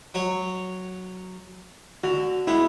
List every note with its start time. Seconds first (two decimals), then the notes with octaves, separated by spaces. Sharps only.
0.14 F#3 C#5
2.04 D3 F#4
2.47 G#3 B3 E4